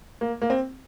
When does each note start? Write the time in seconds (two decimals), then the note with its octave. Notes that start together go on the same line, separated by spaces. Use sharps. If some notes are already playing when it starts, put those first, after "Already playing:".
0.21 A#3
0.42 A#3
0.50 C4